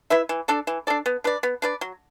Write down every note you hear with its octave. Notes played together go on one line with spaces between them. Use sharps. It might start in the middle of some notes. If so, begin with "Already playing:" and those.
E4 B4 E5
E3
D4 A4 D5
E3
D4 A4 D5
B3
D4 B4 D5
B3
D4 B4 D5
F#3